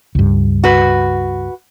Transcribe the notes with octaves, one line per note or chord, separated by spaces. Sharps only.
C#2 G2
F#4 B4